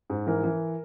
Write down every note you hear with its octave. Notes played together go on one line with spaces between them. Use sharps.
G#2
E3 A#4
E3